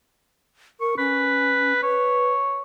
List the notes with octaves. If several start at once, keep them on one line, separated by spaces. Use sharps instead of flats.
A#4 C#6
C#4 B4
B4 C#5